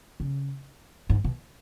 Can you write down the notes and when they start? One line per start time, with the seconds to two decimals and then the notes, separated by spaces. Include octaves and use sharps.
0.20 C#3
1.09 G#2
1.24 B2